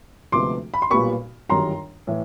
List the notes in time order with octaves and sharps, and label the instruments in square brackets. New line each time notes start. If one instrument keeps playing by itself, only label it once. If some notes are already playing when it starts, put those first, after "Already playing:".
[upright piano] D2 C3 F3 G#3 B3 C6 D6
B5
C6
B1 A#2 G3 B3 B5 C#6
G1 F#2 D#3 G3 A#5 C6
A2 E3